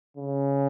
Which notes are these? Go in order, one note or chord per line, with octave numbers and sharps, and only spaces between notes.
C#3